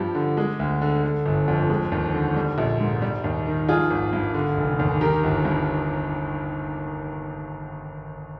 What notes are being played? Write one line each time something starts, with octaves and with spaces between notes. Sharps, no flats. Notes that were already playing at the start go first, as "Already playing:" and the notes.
Already playing: G2 F3 G4
D3
G#3
D2
D3
D3
G1
F2
G#3
D#2
D3
G3
A#1
G#2
G3
D#2
D#3
F3 F4 G#4
G#1
G2
D3
F1
D#2
D#3 G4 A#4
G1
G2